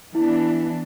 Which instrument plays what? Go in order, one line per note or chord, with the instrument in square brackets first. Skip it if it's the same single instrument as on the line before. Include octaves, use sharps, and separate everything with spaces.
[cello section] E3 B3 D4 [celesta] E4